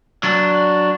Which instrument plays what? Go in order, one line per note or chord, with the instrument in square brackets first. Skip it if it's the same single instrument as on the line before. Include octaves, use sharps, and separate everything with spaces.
[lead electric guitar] F#3 D4